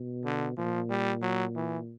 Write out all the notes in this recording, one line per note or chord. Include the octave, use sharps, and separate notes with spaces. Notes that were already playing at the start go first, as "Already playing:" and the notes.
Already playing: B2
D3
A#2 F3
G3
F#3
E3